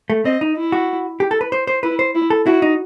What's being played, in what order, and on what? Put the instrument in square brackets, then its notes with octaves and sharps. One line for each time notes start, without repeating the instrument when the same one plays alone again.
[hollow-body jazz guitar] A3
[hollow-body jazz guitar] C4 [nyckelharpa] D#5
[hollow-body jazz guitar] D#4
[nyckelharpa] E4
[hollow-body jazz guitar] F#4
G4
A4
B4
C5
C5
[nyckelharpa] E4 [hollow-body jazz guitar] B4
[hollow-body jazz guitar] C5
[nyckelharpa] E4
[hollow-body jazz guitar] A4
[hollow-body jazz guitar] E4 [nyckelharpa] F#4
[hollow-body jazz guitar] D#4